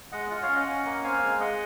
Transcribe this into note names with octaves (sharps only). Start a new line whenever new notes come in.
G#3 D#5 F#5
F4 D#5 F#5
C#5 F5
C#4
D#5 F#5
C#4
A#3
C4 F5 G#5
G#3
G#4 D#5 F#5